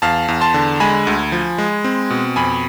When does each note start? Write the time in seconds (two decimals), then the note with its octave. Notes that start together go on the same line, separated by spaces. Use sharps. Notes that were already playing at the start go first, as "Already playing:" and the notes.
0.02 E2 F5 A5
0.28 E2
0.41 A5 C6
0.54 D3
0.80 G#3 G#5 B5
1.07 D2
1.32 F3
1.58 G#3
1.84 C4
2.10 B2
2.36 F2 G#5 B5